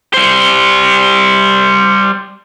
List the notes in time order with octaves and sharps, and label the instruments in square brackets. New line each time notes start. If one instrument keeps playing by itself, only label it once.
[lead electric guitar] G3 C5